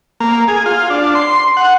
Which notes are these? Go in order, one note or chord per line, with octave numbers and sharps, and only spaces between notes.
A#3
G#4
F4
D4
C6
F#5